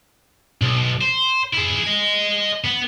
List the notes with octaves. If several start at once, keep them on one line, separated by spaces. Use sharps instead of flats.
B1
C5
E4 G#4
D#5 G#5
B3